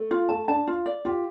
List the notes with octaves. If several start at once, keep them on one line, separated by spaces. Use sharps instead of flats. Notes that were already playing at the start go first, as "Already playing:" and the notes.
Already playing: A3
F4
A3 A5
D4 A5
F4
D5
F4 G4